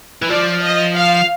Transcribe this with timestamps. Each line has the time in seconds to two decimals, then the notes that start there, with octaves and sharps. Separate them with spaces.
0.22 E3
0.29 F3 D5
0.63 D#5
0.95 F5